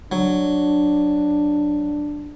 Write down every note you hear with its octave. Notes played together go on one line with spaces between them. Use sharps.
F#3 D4